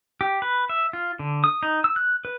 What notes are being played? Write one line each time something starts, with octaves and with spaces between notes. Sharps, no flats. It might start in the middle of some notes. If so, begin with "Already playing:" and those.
G4
B4
E5
F4
D3
D#6
D#4
E6
F#6
B4